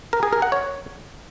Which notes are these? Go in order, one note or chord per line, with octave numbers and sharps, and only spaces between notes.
A#4
G#4
A#4
F#5
C#5